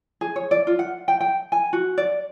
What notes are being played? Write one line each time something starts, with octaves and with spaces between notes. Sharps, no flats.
G#4
C#5
D5
F4
F#5
G5
G5
G#5
F#4
D5